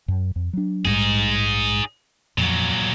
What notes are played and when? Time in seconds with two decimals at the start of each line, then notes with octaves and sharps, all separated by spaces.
0.08 F#2
0.36 F2
0.53 F#3 D4
0.85 A#1 G#2 G3 D#4 G#4
2.38 F2 A#2 F#3